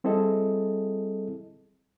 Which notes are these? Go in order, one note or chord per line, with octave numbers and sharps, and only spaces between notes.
G3 C4 E4 G#4 A4 D#5